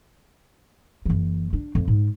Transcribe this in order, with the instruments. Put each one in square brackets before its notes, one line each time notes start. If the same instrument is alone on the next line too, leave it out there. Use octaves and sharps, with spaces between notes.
[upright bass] F#1 E3
D4
F2
G#2